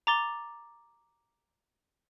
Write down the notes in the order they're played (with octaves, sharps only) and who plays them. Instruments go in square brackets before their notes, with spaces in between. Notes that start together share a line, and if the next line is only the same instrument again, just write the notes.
[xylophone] A#5 D6 A6 G7